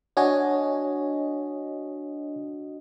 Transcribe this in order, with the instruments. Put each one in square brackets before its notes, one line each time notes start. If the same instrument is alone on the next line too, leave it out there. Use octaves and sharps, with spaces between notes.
[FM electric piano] D4 F#4 D#5 [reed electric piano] C#5 G#5